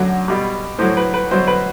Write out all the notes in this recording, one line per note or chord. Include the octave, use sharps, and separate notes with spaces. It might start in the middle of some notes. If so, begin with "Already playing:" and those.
Already playing: F#2 D3 F#3
B2 G3
A2 F#3 C5
B4
B4
B2 F#3 C5
B4